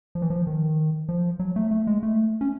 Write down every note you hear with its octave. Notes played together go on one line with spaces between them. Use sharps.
F3
E3
F3
D#3
F3
F#3
A3
A3
G#3
A3
C#4